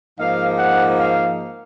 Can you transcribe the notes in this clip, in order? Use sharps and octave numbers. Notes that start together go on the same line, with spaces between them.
G#2 F3 A#3 D#4 F5
F#5
F5